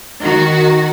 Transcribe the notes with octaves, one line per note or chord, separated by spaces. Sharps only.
D#3 F#4